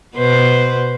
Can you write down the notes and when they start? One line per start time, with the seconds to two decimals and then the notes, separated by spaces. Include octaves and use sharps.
0.16 B2 B4 C5